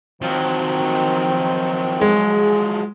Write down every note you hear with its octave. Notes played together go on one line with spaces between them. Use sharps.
D#3 F3 F#3 C4
G#3 G#4